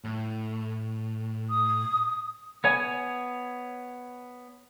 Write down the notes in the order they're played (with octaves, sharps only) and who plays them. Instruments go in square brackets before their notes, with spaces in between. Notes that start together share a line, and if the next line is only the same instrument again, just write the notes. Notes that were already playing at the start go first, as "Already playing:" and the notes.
[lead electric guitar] A2
[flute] D#6
[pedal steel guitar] B3 C#5 G#5